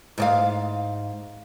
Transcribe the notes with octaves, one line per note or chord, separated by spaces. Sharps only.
G#2 D5 F5